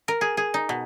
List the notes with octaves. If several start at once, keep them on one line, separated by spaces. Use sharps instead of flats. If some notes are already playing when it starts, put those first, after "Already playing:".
A#4
G#4
G#4
D#4
B2